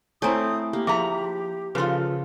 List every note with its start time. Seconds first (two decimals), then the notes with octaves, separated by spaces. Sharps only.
0.22 A3 C4 E4 C#5 G#5 A#5 D#6
0.73 A#3 G4
0.87 F3 G#4 E5 A#5 B5 C#6
1.75 C#3 F3 F4 A4 B4 C5 C6